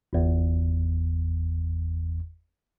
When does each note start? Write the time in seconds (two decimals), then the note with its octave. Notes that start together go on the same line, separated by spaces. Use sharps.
0.13 G1 E2